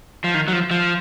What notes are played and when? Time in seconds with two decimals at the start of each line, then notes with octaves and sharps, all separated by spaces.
0.24 F3
0.34 D#3
0.48 F#3
0.53 F3
0.71 F3